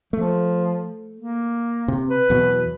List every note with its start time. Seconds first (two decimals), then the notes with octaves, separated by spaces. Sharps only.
0.13 F3 A3
1.16 A#3
1.88 C3
2.10 B4
2.30 E2 B2 F#3